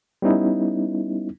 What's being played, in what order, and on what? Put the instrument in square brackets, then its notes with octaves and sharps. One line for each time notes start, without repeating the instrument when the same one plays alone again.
[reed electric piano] G3 B3 C#4 D#4 E4